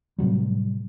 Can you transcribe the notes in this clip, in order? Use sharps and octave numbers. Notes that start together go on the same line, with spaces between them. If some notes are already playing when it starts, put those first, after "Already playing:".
A2 C3 F#3 G3